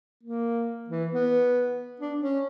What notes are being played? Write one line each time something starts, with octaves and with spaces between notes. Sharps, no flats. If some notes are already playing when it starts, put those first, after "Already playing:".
A#3
E3
B3
D4
C#4